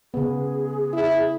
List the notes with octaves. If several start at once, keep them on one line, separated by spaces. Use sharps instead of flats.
C#3 B3 G#4
E4